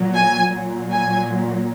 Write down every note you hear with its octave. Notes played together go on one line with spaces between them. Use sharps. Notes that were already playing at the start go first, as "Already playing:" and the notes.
Already playing: A#2 F#3
G#5
A#2 F#3
G#5